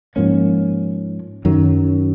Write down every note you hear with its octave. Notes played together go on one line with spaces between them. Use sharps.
G#2 F3 A#3 C#4
F#2 D#3 F#3